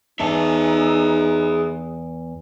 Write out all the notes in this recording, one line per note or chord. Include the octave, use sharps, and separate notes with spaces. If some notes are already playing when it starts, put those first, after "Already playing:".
E2 D#4 G#4 E5 A5